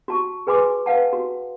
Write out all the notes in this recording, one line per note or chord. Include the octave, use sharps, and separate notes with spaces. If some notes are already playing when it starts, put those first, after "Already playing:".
F#4 A5 C#6
G#4 B4 G#5 C6 D6
B4 F5 F#5 A5
F#4